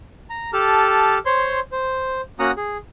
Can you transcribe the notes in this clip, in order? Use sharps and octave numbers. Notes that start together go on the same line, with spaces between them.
A#5
G4 A4 A5 F6
C5 C#5 C6
C5
A#3 C#4 F#4 F#5 A#5 D#6
G#4